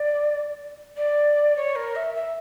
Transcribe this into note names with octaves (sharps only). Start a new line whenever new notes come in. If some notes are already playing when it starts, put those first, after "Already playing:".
Already playing: D5
D5
C#5
A#4
E5
E5